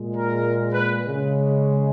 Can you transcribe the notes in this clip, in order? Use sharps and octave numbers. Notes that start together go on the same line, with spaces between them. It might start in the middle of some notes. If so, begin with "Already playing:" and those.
Already playing: A#2 G#3
A#4
B4
C#3 G#3